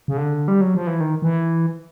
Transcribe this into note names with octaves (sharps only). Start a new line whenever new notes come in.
C#3
D3
G3
F#3
F3
E3
D#3
E3